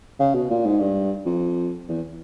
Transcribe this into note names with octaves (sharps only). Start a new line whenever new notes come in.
C#3
B2
A#2
G#2
G2
F2
E2